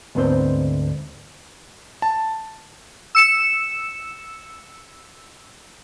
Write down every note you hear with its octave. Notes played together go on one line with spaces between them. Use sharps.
D2 G#2 B3 C4 C5
A5
E6 C#7 E7